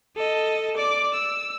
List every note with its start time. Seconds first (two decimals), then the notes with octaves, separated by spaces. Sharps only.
0.16 A4 D#5
0.76 D5 D6
1.14 E6